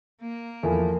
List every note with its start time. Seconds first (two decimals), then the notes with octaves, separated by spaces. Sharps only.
0.21 A#3
0.63 E2 F3 E4 A4 A#4 G#5